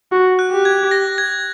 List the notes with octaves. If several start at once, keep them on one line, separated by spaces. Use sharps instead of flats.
F#4
F#6
G4
G#6
A#6
G#6